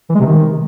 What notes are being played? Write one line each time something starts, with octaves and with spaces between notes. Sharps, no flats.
E3
G#3
C3
D#3